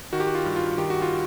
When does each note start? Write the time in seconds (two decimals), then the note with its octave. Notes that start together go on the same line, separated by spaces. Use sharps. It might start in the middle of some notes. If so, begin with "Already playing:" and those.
0.13 D#3 F#4
0.20 G4
0.27 F#4
0.35 F4
0.45 G2
0.56 F4
0.78 D#3 G4
0.90 F#4
1.02 F4